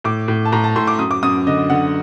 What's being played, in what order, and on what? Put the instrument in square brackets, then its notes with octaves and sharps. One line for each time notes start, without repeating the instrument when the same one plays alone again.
[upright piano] A2 D6
A2
A5
A2 A#5
A5
A2 C6
D6
F#2 D#6
D6
F#2 D#6
D3 D#5
D3 F#5